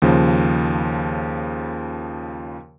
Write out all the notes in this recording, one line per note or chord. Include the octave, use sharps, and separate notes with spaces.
D#2 C#3 F3